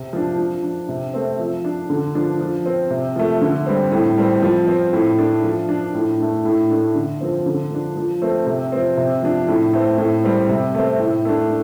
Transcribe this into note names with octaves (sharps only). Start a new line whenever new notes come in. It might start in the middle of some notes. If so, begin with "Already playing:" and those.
Already playing: C3
F3 D4
F3
D4
C3
A3 C4
F3
D4
D3
F3 D4
F3
C4
C3
F3 A3
D3
G3 C4
A2
G3 C4
F3
C4
A2
A3 D4
F3
D4
A2
A3 D4
A2
A3 D4
D3
F3 C4
D3
F3 D4
F3
A3 C4
C3
F3 C4
C3
F3 D4
A2
A3 C4
A2
G3 C4
C3
A3 C4
A2
A3 D4